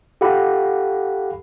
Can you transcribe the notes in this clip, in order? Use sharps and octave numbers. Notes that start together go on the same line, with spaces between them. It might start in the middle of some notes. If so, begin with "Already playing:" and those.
G4 A4 F5 F#5 B5